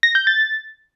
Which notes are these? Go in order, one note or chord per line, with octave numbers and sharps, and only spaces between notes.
A#6
G6
A6